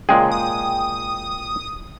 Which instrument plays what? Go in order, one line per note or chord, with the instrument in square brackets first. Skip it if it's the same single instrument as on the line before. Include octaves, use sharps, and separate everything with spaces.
[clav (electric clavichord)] A#2 G#3 G#4 [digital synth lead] C#3 [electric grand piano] G5
[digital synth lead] D#6